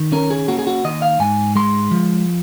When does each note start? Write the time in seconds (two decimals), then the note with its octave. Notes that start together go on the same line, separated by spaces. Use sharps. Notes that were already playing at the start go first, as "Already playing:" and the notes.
Already playing: D#3
0.12 C#4 A#4
0.30 G#4
0.48 A#3 F#4
0.59 G#4
0.67 F#4
0.84 D#3 D#5
1.02 F5
1.20 G#2 G#5
1.55 G#3 C6
1.91 F3